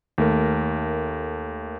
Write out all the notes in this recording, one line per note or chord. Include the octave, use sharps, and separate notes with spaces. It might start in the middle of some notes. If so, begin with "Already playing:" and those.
D#2 A3 A#4